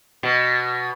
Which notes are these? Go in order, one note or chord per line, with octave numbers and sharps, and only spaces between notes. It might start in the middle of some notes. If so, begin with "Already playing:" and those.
B2